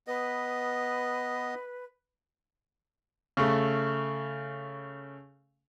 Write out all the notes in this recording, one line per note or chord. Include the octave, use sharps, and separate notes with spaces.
B3 B4 D#5
C#3 A3